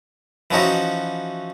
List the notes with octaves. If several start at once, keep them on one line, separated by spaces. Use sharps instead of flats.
E3 F3 C#4 D#4 F#4